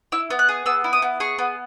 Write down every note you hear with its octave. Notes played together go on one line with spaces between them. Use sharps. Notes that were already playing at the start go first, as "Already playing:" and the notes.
E4 E6
B3
F#6
G#4
B3 E6
E4
D#6
B3
G#4 C#6
B3